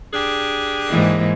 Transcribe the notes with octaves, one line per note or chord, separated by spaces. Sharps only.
D4 G4 G#4
G#2 E3 A#3